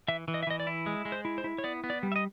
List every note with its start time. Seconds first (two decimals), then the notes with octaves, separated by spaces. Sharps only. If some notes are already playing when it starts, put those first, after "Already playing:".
0.08 E3 E5
0.28 E3
0.34 D#5
0.43 E5
0.47 E3 D#5
0.60 D5
0.67 E4
0.86 G#3
1.05 G#3
1.12 C5
1.25 E4
1.38 C5
1.44 E4
1.58 C#5
1.64 B3 D5
1.84 B3
1.90 D5
2.03 G3
2.12 E5
2.16 D#5